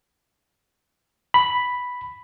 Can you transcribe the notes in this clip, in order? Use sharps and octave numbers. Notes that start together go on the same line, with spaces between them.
B5